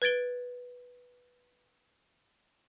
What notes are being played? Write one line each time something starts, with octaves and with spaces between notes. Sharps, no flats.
B4 G#6 A6 D7 G7